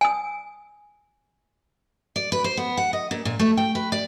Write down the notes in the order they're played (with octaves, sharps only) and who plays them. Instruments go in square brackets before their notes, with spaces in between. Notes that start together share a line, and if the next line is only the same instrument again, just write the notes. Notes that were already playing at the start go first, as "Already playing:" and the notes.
[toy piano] G#5 D#6
[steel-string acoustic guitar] D5
B4
C5
B3
F#5
D#5
A#2
A#2
A3
G5
B4
D5